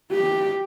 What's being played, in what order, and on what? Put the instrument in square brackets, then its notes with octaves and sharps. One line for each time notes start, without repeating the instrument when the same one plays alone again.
[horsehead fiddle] G4